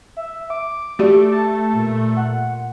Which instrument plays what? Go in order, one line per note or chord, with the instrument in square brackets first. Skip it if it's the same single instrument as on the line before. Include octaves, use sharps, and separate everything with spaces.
[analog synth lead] E5
D6
[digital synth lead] A3 [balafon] F#4 G4 D5
[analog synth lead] A5
[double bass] A#2
[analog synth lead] F#5